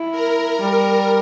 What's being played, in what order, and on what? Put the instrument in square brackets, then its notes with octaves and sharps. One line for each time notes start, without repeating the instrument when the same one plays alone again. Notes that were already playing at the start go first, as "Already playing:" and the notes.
Already playing: [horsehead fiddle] E4
[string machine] A#4
[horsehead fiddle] G3 [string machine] A#4